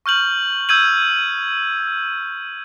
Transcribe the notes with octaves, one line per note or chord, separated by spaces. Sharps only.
C#6 F6 G6 F#7
E6 G6 G#6 D#7 F#7